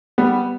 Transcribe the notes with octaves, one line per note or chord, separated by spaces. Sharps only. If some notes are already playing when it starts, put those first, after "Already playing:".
G3 B3